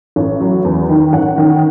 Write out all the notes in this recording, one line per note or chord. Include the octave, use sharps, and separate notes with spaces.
A1
F#3
E2
D#3
A1 F#5
D#3